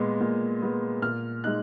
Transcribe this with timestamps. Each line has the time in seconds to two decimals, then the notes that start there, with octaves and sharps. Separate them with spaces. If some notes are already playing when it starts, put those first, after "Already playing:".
Already playing: A#2 G#3 B3
0.20 A#2
0.62 G#3 B3
1.02 A#2 F6
1.44 G#3 D#4 F#6